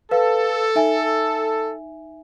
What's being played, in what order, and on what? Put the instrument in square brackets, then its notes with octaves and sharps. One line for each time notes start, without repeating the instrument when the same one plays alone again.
[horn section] A4 [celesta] B4 F5
[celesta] D#4 E5 G#5